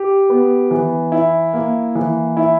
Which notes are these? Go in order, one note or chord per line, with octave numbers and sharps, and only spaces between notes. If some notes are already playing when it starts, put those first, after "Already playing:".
Already playing: G4
B3
E3
E4
A#3
E3
E4